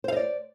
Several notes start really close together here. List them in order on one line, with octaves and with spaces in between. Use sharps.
C5 F5 D#5 D5